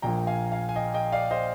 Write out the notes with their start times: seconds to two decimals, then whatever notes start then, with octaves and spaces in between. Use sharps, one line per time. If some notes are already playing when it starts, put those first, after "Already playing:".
0.02 A#1 A#2 F3 G5 A#5
0.27 F5 G#5
0.52 F5 G#5
0.69 G#5
0.76 D#5 G5
0.94 D#5 G5
1.12 D5 F5
1.31 C5 D#5